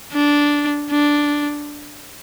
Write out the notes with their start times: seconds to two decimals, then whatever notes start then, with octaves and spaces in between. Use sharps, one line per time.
0.13 D4
0.90 D4